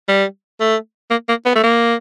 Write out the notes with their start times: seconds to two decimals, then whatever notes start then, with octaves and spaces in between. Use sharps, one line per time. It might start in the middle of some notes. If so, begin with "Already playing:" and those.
0.08 G3
0.60 A3
1.10 A#3
1.29 A#3
1.46 B3
1.55 A3
1.63 A#3